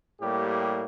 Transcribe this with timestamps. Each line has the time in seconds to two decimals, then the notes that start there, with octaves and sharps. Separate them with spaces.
0.21 A2 G3 A#3 G4